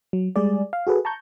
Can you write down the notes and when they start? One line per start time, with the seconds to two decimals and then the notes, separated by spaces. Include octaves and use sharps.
0.13 F#3
0.36 G3 G#3 G#4 D5
0.73 F5
0.87 F#4 G#4 A4 B4
1.05 A5 A#5 C#6 G6